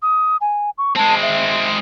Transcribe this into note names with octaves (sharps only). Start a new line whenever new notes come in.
D#6
G#5
C#6
G#3 C4 A5
E5